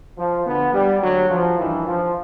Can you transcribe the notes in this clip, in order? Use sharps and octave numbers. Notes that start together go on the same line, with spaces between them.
F3
D2 D3 B3
G3
D2 D3 F#3
F3
G2 D#3 E3
F3